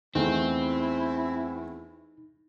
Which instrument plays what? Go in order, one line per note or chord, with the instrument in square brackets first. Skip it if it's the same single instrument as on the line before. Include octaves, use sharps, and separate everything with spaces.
[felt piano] E2 A3 [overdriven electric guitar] C4 [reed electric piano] D#4 [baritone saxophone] E4